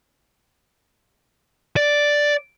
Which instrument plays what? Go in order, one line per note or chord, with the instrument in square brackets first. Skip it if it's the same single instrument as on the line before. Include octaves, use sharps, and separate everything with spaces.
[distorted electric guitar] D5